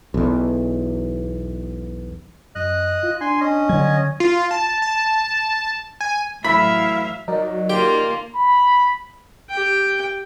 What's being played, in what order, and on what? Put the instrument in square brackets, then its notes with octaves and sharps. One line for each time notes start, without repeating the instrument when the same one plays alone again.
[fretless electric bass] B1 E2
[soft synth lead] F#2 [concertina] D#5 F#6
[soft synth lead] F4
[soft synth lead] D4 [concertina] G#5 C6
[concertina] C#4 D#5
[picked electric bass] D3 F#3 [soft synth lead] G#6
[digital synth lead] F4
A5
A5
G#5
[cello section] A2 E3 F#3 [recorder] E4 [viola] E5 F5 [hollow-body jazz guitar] B5
[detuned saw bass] F#3 [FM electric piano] D#4 A#4 D5
[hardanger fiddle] A#3 F4 [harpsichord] G4
[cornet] B5
[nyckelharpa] G4 G5